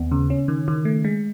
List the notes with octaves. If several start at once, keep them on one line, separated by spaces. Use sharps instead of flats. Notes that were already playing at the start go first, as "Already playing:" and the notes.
Already playing: D#2 B3
C#3
C#4
D#3
D#3
A3
G#3